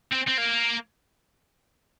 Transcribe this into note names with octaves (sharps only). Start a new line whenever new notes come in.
C4
C4
A#3